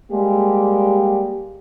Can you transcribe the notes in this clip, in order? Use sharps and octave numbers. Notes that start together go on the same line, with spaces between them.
G3 G#3 A#3 G4